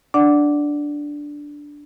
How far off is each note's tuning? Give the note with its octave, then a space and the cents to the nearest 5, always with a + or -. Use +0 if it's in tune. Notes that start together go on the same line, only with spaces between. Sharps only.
D4 -5 D5 +0 F#5 +0